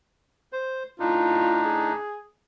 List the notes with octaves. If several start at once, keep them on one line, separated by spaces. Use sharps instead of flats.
C5
A2 D4 D#4 F4
G#4